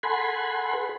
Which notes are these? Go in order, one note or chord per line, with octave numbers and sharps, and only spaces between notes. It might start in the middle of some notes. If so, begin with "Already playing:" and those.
A4 F#5 G#5 B5 C6
G#4 B4